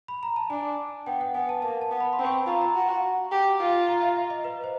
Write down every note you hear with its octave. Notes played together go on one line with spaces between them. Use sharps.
B5
A#5
A5
D4 G#5
B3 G5
F#5
B3 G#5
A5
A#3 A5
A5
B3
B5
C6
C4 B5
C#6
C6
F4 A#5
A#5
F#4
G4
F4
A#5
E5
E5
D#5
B4
C5